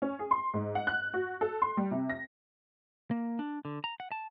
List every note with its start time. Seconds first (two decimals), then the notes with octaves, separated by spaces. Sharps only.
0.02 C#4
0.19 G#4
0.31 C6
0.54 G#2
0.75 F#5
0.87 F#6
1.14 F#4
1.41 A4
1.62 C6
1.77 G3
1.91 C3
2.09 A#6
3.11 A#3
3.39 D4
3.65 D3
3.84 A#5
4.00 F#5
4.12 A5